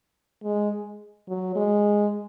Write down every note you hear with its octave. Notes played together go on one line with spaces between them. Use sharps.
G#3
F#3
G#3